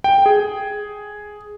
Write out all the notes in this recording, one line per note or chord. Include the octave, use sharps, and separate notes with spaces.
G5
G#4